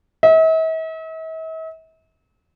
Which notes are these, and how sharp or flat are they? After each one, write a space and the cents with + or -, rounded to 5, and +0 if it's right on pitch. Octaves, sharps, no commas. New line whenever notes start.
E5 -45